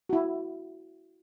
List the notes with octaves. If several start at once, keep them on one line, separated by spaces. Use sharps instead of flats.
E4 F#4